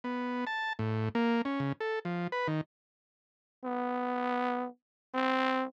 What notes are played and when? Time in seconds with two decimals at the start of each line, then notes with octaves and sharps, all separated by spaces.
0.04 B3
0.47 A5
0.79 A2
1.15 A#3
1.45 C#4
1.60 C#3
1.81 A4
2.05 F3
2.32 B4
2.48 D#3
3.65 B3
5.14 C4